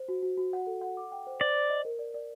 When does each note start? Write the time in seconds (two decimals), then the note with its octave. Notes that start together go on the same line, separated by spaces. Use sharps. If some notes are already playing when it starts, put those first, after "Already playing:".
Already playing: C5
0.08 F#4
0.23 F#4
0.38 F#4
0.53 F#5
0.67 A4
0.81 F#5
0.97 D6
1.12 G5
1.27 C5
1.40 C5 D5
1.56 C5
1.70 D#5
1.85 A#4
1.99 D5
2.14 D5